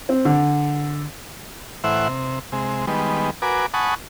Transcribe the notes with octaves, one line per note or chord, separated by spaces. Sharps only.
C4
D3
A2 E3 C5 E5 F#5
C3
C3 G#3
D#3 G3 G#3 B3
F#4 A#4 B4 G#5 D6
F#5 G#5 A5 B5 C#6 D#6